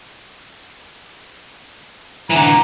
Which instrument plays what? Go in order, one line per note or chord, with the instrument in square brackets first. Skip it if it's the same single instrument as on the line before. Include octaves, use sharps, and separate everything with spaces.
[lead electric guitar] D3 E3 [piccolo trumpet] A#5